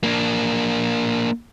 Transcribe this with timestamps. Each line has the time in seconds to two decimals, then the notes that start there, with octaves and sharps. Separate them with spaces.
0.04 A#3 D4